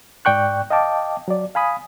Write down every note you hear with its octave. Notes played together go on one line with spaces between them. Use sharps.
G#2 D5 G5 C#6 F#6
D#5 F5 G5 A5 D6
F#3 D5
F5 G#5 B5 D#6